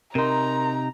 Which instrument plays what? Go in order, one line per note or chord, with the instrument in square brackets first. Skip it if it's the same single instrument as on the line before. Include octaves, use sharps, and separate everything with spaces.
[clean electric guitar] C3 D#4 [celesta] A#4 C6 [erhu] A#5